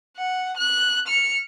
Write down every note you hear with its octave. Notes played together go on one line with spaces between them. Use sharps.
F#5
F#6
F6 C#7